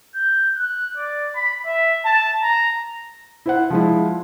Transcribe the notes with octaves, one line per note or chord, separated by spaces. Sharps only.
G6
F#6
D5
B5
E5
A5
A#5
E4 C5 F#5
F3 G#3 E4